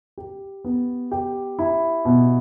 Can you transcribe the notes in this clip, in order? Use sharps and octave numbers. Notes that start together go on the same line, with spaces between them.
G4
B3
G4
E4
B2